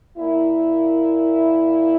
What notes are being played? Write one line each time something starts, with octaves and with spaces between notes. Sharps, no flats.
A#2 A#3 E4